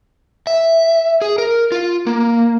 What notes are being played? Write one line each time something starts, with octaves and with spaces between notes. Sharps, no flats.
E5
G#4
A#4
F4
A#3